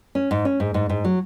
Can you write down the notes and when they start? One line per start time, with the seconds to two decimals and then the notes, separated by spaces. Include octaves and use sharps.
0.15 C#4
0.31 G#2
0.45 C#4
0.60 G#2
0.74 G#2
0.89 G#2
1.05 F#3